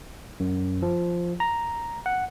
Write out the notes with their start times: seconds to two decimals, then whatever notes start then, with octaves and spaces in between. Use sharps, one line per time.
0.40 F#2
0.82 F3
1.40 A#5
2.06 F#5